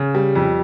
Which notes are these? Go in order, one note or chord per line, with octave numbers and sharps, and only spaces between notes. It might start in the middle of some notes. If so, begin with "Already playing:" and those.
Already playing: C#3
G3
F2